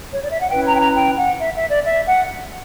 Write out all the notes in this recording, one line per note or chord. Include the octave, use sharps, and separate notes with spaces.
C#5
D5
E5
F#5
C#4 E4 B4 G5
A#5
G5
A#5
G5
F#5
E5
E5
D5
E5
F#5